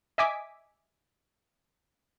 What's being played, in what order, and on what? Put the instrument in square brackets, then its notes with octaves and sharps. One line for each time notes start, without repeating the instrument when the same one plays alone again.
[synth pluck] D#5 E5 G#5 D6 B6